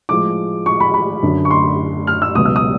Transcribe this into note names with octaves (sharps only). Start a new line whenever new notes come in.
A2 F3 G#3 D6
C#6
B5
B5
F#2 D3 F#3
C#6
C6
F6
E6
C#2 B2 F#3 D#6
E6
D#6